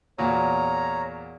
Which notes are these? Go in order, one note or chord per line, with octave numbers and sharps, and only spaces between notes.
E2 A#2 F#4 C#5 A#5